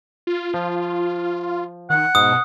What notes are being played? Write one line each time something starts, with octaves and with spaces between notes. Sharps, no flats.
F4
F3
D#3 F#5
G#2 B2 D#6